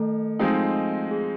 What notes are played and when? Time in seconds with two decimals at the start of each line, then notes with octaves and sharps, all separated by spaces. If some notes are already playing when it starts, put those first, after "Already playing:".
Already playing: D#3 A3 A4
0.39 F3 G#3 C4 D#4
1.11 G#4